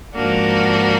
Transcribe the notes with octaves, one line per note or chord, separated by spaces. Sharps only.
G#2 F3 A#3 D4 F#4